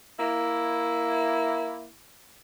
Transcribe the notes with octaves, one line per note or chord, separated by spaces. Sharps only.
A#3 E4